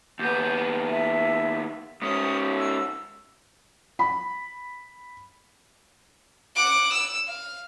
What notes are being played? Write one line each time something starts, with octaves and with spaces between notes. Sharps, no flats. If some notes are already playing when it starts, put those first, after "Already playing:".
D#2 B3 G6
E5
G#2 C#4 D#6
E6
B5
F#5 D6
E6
F5